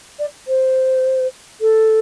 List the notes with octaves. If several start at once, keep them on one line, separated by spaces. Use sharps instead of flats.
D5
C5
A4